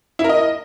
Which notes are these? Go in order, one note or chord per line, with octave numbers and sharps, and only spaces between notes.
E4
A#4
D#5